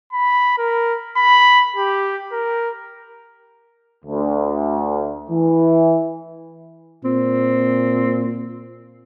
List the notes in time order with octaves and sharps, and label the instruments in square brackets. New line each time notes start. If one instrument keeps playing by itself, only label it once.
[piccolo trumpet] B5
A#4
B5
G4
A#4
[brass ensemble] D2
E3
[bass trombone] A#2 [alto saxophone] C4